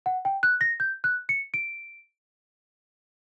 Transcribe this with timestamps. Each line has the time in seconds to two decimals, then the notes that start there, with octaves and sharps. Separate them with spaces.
0.06 F#5
0.25 G5
0.43 F#6
0.61 A#6
0.80 G6
1.04 F#6
1.29 C#7
1.54 D7